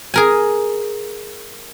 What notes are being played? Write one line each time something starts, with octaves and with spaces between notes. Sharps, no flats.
G#4 A#4 G#5